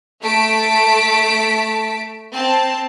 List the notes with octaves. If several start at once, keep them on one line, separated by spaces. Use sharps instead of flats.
A3 A5 B6 D7
C4 A5